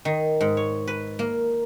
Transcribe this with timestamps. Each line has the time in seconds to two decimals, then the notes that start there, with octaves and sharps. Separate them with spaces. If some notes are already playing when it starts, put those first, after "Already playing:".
0.05 D#3
0.41 G#2
0.57 C#5
0.87 B4
1.19 A#3